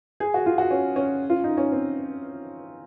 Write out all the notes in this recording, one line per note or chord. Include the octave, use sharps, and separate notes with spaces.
G#4
F#4
F4
F#4
C#4
C#4
F4
D#4
C#4
C4